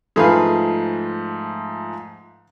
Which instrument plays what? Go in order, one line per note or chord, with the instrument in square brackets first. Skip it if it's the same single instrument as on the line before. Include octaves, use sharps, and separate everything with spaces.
[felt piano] G#2 F3 A3 [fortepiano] G#4 B4 F5